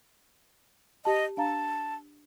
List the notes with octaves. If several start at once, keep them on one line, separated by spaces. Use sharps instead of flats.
G4 D#5 A5
D4 F5 A5 A#5